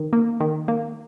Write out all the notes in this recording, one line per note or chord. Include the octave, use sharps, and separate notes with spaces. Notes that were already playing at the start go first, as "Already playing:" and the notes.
Already playing: D#3
A#3
D#3
A#3